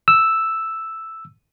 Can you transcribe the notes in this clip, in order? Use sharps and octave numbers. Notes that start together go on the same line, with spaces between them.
E6